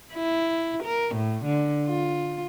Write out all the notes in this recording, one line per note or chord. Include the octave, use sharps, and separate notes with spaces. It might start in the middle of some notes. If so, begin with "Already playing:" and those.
E4
A#4
A2
D3
F4